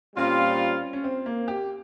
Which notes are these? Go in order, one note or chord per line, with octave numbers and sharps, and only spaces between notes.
A#2 G3 C4 C#4 F4
C#4
C4
A#3
G4